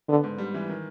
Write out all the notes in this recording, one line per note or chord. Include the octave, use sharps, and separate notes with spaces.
D3 B3
G#2
G3
E3
D#3